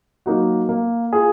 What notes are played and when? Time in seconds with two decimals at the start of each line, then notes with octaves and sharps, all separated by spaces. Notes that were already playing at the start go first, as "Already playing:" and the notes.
0.26 F#3 A#3 D#4 F#4
0.69 A#3
1.13 F4 G#4